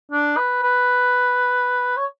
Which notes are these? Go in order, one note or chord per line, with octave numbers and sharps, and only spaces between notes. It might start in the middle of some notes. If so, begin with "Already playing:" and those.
D4
B4
B4
C#5